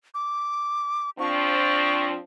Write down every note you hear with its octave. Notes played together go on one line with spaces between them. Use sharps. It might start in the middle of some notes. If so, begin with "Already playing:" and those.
D6
F3 C4 D4 C#6